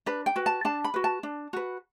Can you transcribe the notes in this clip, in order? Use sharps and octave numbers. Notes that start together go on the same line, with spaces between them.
D4 B4
G5
F#4 B4
A5
D4 A5
B5
F#4 B4
A5
D4
F#4 B4